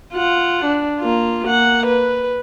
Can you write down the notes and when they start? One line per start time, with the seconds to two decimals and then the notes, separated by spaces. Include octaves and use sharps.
0.14 F4 F#5
0.65 D4
1.00 A#3 F4
1.46 A#3 F#5
1.87 B4